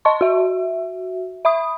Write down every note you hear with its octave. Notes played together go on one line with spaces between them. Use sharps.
D#5 A5 C6 C#6
F#4 E5
E5 B5 D#6